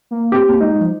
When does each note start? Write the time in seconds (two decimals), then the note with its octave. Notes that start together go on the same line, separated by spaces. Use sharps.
0.11 A#3
0.32 C4 G4
0.49 A#3
0.61 G#3 D#4
0.80 F3